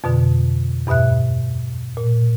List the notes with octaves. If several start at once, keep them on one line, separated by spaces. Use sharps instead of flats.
F2 B2 D3
E2 G2 B2 E5 F#6
A#2